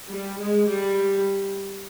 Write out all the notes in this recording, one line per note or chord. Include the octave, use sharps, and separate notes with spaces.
G3
G#3
G3